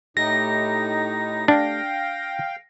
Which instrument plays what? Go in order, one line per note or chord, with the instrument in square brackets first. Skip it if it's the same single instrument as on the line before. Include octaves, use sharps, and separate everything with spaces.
[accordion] A2 D#4 [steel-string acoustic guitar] A3 G4 [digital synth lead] A#6
[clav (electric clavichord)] D4 [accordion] F5 G5